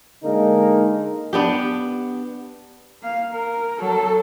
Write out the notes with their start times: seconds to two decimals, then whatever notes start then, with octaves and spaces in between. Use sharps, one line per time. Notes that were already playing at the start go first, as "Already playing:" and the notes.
0.23 D3 G#3 A#3 D#4 A4 A#4
1.33 B3 D4 G4
3.02 A#3 F5
3.33 A#4
3.79 F#3 A4